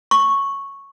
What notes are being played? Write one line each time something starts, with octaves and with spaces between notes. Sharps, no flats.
C#6